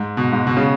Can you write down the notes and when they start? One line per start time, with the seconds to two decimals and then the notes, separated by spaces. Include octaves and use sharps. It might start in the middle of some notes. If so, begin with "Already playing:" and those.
Already playing: G#2
0.17 B2
0.32 G#2
0.47 B2
0.57 C#3